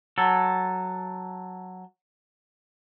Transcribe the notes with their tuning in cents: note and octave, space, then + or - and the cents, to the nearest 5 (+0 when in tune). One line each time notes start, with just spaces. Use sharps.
F#3 +0 A4 +0